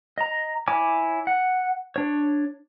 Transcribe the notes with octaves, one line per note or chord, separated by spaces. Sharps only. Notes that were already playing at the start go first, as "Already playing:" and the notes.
D#5 A#5
E4 C#5 G#5 D6
F#5
D4 C#5